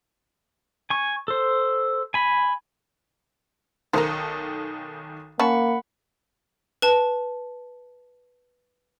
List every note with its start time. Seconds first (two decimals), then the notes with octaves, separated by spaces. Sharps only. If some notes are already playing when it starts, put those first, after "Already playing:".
0.90 G#5 C#6
1.28 A4 C5
2.14 G#5 B5
3.93 B1 D#3 A4 A#4 C5
5.40 A#3 C#4 F#5 A5 B5
6.82 B4 A5